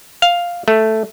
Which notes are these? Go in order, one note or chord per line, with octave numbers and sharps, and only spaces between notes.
F5
A3